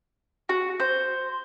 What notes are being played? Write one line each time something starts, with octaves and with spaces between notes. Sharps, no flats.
F#4
C5